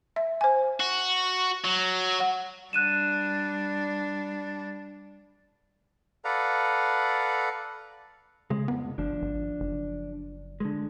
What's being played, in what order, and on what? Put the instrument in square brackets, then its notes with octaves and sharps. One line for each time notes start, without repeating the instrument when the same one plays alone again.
[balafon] E5
C5 G#5
[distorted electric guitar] F#4
F#3
[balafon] F#5
[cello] G3 D4 [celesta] F#6 D#7 E7
[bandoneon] A4 B4 D5 F5 F#5 A#5
[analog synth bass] C#3 [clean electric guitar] G#3
[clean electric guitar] C2 F2 [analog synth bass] B3
[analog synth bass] G1 [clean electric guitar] F3 D4
[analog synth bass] G#1
F#1
[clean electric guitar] D3 G#3